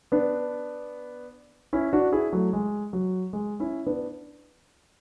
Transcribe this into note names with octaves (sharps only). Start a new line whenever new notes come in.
B3 D4
C#4 E4
D4 F#4
E4 G#4
F#3 A3
G#3
F#3
G#3
C#4 E4
B3 D4